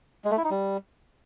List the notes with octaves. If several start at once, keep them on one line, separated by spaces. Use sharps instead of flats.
G#3
A3
E4
D#4
G3